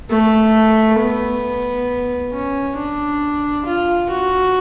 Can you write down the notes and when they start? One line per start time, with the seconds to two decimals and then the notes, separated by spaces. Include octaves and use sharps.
0.10 A3
0.99 B3
2.32 C#4
2.77 D4
3.65 F4
4.10 F#4